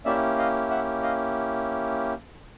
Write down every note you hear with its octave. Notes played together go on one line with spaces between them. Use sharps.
A#3 C#4 E4 G4 D5 E5
D#5 F5
E5 F#5
D#5 F5